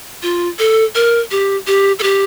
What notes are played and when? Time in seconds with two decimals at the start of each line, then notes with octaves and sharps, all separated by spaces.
0.23 F4
0.59 A4
0.95 A#4
1.31 G4
1.67 G4
1.99 A4
2.03 G4